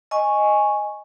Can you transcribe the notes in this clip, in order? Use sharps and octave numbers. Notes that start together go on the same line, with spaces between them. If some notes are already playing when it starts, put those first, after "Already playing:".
D#5 G#5 C#6